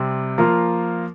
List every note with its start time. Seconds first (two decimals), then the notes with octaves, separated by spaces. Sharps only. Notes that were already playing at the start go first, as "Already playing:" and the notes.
Already playing: C3 G3 C4
0.38 F3 A#3 F4 A#4